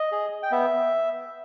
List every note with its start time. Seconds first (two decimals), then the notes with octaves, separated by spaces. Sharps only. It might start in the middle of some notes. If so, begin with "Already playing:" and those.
Already playing: D#5
0.12 G#4
0.43 G5
0.52 B3 E5